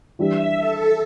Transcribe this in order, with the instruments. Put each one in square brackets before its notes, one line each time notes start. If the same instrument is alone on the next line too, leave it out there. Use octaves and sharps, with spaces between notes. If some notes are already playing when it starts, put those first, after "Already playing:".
[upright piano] E3 G3 D4 G4 [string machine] E5
[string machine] A4